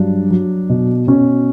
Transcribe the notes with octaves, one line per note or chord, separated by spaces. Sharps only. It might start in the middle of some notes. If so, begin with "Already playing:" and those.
Already playing: G2 F#3 D4
F#3
B2
B2 C#4